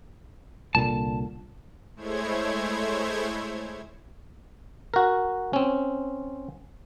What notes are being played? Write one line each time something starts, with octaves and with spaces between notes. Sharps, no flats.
C2 A#2 D3 A5
G#3 A3 E4 C5 C#5 G#6
F#4 A#4
C4 C#4